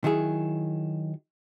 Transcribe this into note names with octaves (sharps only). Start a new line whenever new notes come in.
D#3 F#3 E4 G#4